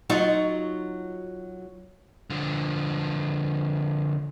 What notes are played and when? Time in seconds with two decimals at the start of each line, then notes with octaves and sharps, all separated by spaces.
0.10 F#3 D#4 F4
2.30 D3 F3